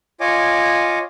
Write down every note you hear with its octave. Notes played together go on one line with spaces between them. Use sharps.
F4 C#5 D#5 G#5 D6